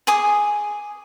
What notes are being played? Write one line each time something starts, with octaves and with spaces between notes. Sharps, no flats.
G#4 G#5 D6 D#6